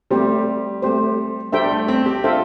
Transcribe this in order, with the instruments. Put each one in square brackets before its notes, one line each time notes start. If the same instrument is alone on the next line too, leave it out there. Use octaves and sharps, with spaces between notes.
[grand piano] G3 [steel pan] A3 C4 G4 C5
[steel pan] A3 C4 G4 C5
[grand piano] G3 [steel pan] D4 A4 C5 E5 G5
[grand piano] A3
C4
G4
[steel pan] D4 A4 C5 E5 G5 [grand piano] F4